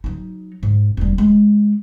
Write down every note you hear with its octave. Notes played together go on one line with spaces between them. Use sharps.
F#3 D#4
G#2
E1 G3
G#3